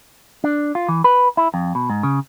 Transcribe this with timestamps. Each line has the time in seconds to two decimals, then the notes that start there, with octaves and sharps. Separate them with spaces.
0.44 D4
0.75 F4
0.88 E3
1.04 B4
1.37 E4
1.54 F2
1.75 B2
1.90 G#2
2.03 C#3